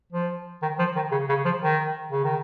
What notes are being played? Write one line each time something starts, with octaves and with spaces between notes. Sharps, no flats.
F3
D#3
F3
D#3
C#3
C#3
F3
D#3
C#3
D#3